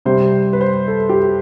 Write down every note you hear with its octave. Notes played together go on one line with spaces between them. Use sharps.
C3 G3 C5
B4
C5
A4
G4